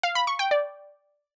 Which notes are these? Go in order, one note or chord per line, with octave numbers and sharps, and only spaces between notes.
F5
B5
C#6
G5
D5